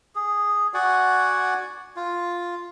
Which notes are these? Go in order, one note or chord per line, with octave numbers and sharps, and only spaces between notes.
G#4
F#4 D5 F#5 G#5
F4